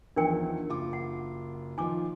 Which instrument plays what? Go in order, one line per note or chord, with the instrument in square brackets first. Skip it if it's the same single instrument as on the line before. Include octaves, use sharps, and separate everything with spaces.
[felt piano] E2 D#3 F3 [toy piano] D4 A#4 G5
[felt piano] F#1 F4 D6
[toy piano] F#5
[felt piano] D#3 F3 F4 [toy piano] G#5 D6